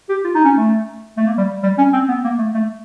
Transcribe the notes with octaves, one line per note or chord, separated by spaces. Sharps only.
G4
F4
D#4
C#4
A3
A3
A#3
G3
G3
C#4
C4
B3
A#3
A3
A3